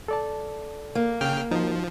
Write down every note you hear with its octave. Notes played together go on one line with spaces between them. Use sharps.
A4 D5 A5
A#3
C#3 G5 F6
F3 D#4 F#4